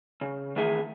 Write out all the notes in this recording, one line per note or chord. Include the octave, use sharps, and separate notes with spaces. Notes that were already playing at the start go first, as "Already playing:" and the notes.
C#3
D#3 E3 A3 G#4 E5